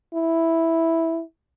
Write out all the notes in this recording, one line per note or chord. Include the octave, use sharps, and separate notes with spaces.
E4